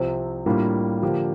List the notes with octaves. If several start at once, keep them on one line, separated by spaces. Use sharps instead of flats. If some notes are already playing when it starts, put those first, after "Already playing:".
Already playing: C2 C3 F3 C4
A2 G3 A#3 D4 F4
D3 F3 A#3 D4 G4